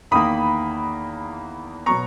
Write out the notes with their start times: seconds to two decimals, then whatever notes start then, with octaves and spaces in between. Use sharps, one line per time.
0.11 E2 D#3 A#3 B5 D#6
1.86 B2 F#3 B3 A#5 C#6